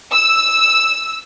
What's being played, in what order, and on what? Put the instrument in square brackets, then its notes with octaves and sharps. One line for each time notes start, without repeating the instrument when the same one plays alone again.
[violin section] E6